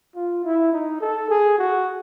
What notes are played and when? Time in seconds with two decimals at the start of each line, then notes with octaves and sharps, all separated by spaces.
0.16 F4
0.45 E4
0.72 D#4
1.01 A4
1.30 G#4
1.58 F#4